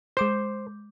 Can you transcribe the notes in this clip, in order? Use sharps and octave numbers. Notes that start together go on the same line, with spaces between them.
G#3 C5 D6 G6